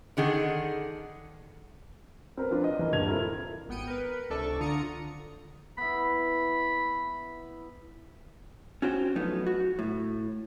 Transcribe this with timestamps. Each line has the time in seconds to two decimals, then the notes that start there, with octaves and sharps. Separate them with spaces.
0.17 D3 D#3 G#4 F#5
2.37 C4 A#4 B4
2.51 F3 C4 D4 F4
2.64 D#5
2.79 E3 A#4
2.93 D#1 G2 G#6 F7
3.08 C4 E4 F4 A4 A#4
3.69 G#1 B3 G5 C#7 D#7
3.87 A#4 B4
4.30 C#2 C3 D4 A4 D5 C#6
4.60 D3 F4 A#5 D#6 C#7
5.78 B3 E4 B5
8.82 C#4 F#4 C5 G5
9.16 F3 F#3 A3 B3 D#4 F4
9.47 F#4
9.79 A2